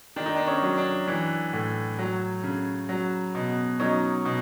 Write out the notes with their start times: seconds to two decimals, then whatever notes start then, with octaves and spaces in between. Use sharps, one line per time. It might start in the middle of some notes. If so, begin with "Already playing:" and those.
0.16 D#3 D4
0.26 D#4
0.36 D4
0.47 C#4
0.62 F#3
0.78 D4
1.08 E3 D4
1.53 A2
1.99 F#3
2.43 C#3
2.89 F#3
3.35 B2
3.80 F#3 C#4 D#4
4.25 B2